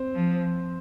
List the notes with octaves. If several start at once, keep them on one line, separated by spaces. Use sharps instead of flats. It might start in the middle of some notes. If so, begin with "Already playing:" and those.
Already playing: C4 C5
F3